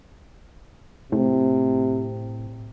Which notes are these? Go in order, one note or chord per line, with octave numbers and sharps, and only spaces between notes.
A2 C3